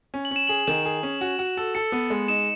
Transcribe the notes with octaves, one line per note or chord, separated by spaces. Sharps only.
C#4
F#7
C#4 E7
G#4 F#7
D#3 E7
G#4
C#4
F#4
F#4
A4
A4 C#7
B3
G#3
D#4 E7